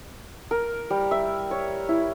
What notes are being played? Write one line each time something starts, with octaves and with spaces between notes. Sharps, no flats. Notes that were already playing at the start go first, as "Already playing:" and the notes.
A#4
G3
E5
C#5
E4